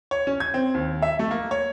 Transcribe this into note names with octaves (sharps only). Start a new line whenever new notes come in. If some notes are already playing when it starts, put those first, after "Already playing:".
C#5
C#4
G#6
C4
D#2
E5
A3
A#3
C#5